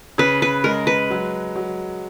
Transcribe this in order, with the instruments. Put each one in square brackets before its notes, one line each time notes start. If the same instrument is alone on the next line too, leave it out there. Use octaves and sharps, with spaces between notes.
[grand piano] C#3 [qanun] B4
[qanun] B4
[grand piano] G#3 [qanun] A#4
[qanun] B4
[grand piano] F#3
F#3